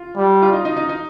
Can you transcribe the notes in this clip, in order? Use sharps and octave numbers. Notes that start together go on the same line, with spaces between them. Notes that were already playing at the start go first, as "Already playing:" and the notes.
Already playing: F4
G3
F4
D#4
D#4
D#4
D#4